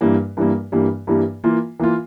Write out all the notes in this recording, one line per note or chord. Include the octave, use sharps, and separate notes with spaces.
G2 E3 G3 A#3
G2 E3 G3 A#3
G2 E3 G3 A#3
G2 E3 G3 A#3
E3 A#3 F4
E3 A#3 F4